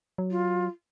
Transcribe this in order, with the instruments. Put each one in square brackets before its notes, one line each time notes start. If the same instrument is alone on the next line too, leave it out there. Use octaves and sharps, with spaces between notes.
[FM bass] F#3
[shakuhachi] F4